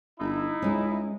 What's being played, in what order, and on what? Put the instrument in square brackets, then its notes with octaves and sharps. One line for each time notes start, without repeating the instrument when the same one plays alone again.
[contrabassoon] G1 [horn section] D#4 E4
[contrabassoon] C#2 [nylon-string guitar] G#3 C#4